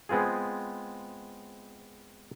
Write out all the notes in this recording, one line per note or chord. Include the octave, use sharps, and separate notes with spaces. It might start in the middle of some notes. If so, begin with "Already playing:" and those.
G#3 B3 C4 F4 G#4